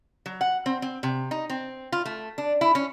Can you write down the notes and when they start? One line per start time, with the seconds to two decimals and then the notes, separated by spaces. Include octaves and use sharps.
0.26 F#3
0.41 F#5
0.66 C4
0.82 C4
1.03 C3
1.31 D#4
1.50 C4
1.92 F4
2.05 A3
2.38 D4
2.61 E4
2.75 C#4